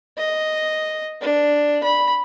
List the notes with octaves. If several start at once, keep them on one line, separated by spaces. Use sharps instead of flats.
D#5
D4
B5